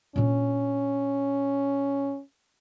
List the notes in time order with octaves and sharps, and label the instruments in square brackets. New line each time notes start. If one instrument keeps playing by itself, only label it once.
[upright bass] A#2 D4 [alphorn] C#4